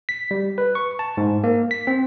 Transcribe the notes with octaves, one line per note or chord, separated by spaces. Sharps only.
B6
G3
B4
C#6
A5
G#2
A#3
B6
C4